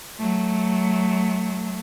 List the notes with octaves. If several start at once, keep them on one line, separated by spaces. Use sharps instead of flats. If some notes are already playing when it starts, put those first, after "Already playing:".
F#3 A3